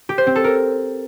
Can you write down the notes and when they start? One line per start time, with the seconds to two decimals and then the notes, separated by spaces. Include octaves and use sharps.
0.09 G4
0.18 C5
0.27 C4
0.36 A4
0.44 A#4